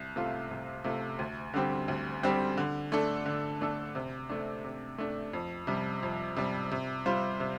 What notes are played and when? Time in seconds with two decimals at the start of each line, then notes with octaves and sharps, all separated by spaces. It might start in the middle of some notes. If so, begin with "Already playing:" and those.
Already playing: C2
0.16 C3 A3 F4
0.51 C2
0.84 C3 A3 F4
1.19 D2
1.54 D3 G3 C4 G4
1.88 D2
2.23 D3 G3 C4 G4
2.57 D3
2.92 A3 D4 A4
3.26 D3
3.61 A3 D4 A4
3.95 C3
4.29 A3 D4
4.64 C3
4.98 A3 D4
5.33 F2
5.67 C3 G3
6.03 F2
6.37 C3 G3
6.71 C3
7.06 G3 F4 C5
7.40 C3